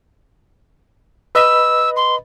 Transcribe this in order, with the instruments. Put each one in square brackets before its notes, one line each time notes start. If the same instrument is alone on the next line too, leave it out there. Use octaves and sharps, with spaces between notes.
[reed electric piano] B4 D#5 B5 [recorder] E6
[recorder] C6